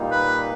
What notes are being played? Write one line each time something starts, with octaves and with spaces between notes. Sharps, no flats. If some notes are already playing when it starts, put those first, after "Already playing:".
Already playing: A#2 G3 A#3 D#4
B4